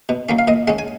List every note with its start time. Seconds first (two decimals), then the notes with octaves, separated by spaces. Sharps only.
0.09 B2
0.29 F#3 A#3 C#4
0.39 F5
0.48 A#2 D#5
0.68 G#3 C#4 F#5
0.79 G#5